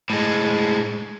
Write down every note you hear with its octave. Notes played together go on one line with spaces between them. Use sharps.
A2 G#3